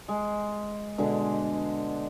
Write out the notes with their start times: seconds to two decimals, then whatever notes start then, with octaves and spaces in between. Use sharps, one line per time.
0.08 G#3
0.98 B2 D3 G#3